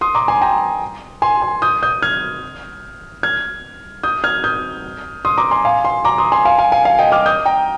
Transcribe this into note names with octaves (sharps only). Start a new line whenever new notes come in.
C6 D#6
A#5 D6
G#5 C6
G5 A#5
G#5 C6
G#5 C6
D#6 G6
D#6 G6
F6 G#6
F6 G#6
D#6 G6
F6 G#6
D#6 G6
C6 D#6
A#5 D6
G#5 C6
F5 G#5
G#5 C6
A#5 D6
C6 D#6
G#5 C6
F5 G#5
F5 G#5
F5 G#5
F5 G#5
D#5 G5
D6 F6
D#6 G6
G5 A#5